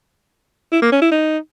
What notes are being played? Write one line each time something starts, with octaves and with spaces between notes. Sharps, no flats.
E4
A#3
C#4
E4
D#4